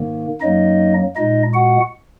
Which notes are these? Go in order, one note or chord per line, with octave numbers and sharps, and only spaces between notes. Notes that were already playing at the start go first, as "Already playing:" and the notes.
Already playing: G#2 D#3 A#3
F#2 F#3 A#3 D#4 D#5
A#2 G#3 D#4 D#5
F#4 F#5